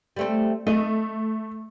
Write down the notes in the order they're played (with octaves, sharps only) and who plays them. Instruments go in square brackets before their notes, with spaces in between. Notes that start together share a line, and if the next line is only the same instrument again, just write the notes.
[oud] G3 A3 C4
[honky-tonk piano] A3 [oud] D#5